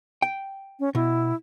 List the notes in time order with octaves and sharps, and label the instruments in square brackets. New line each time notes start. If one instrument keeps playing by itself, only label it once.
[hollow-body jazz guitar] G5
[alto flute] C#4
[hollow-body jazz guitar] B2 [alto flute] E4